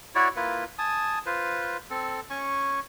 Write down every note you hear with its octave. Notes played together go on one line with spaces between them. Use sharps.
E4 F#4 C#5 D5
A#3 E4 F4 B4
G#5 A5 D#6
F4 B4 C5
C4 A4
C#4 G#5 C#6